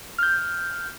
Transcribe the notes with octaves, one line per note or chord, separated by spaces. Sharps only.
F6 G6